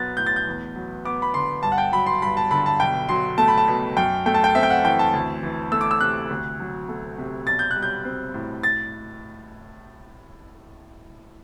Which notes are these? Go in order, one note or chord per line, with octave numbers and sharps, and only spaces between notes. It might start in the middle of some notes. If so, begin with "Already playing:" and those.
Already playing: B1 F#3 B3 F#6 A6
A2 G6
A6
G6
E2
F#3
B3 D6
B5
D3 C6
G2 A5
F#5
G5
F#3 B5
C6
G2 B5
A5
D3 B5
A5
B1 G5
F#3 C6
A3 A5
B5
A5
B2
F#2 G5
A3 G5
A5
G5
C4 E5
G5
F#5
E3 G5
A5
D2
E3
A3 E6
D6
E6
C3 F#6
D2
F#3
A3
C3
B1 A6
G6
F#6
G3
G6
C4
A2
A6